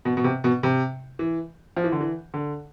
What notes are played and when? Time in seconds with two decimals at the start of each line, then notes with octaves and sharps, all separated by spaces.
0.05 B2
0.17 B2
0.24 C3
0.44 B2
0.63 C3
1.19 E3
1.77 F3
1.84 E3
1.92 D3
2.01 E3
2.34 D3